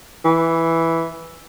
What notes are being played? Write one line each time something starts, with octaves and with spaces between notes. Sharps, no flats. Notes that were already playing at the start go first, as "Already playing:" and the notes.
E3